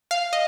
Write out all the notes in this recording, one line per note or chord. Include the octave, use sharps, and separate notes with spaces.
F5
D#5